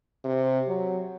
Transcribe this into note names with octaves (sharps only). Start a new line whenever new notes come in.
C3
F#3